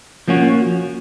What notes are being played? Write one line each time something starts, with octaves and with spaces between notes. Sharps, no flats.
F3 A#3 C#4 F#4